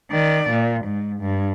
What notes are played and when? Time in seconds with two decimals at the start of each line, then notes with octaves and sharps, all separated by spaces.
0.11 D#3 D5
0.51 A#2
0.85 G#2
1.20 G2